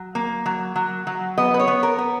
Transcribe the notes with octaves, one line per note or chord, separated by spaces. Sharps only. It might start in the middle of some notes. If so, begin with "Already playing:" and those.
Already playing: F#3
A#3
F#3
F#3
F#3
B3 D#5
B4
C#5
B3
A#4
B3